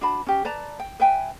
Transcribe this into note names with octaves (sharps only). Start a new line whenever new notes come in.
D4 F#4 A5 B5
C#4 G4
B4 D5 A5 A#5
G5
B4 E5 G5 G#5